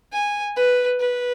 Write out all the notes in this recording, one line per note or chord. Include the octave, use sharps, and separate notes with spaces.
G#5
B4
B4